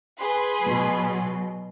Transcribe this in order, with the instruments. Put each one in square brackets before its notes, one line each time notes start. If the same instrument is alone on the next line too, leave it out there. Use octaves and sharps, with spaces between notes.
[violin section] G#4 B4 C6
[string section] B2 F#3